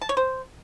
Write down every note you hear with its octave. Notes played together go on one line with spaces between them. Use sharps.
A5
C#5
C5